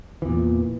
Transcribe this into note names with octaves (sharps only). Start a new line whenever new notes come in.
E2 A#2 E3